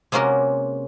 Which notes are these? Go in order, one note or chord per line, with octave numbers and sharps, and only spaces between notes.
C3 G#3 A#3 C#4 F#4 A#4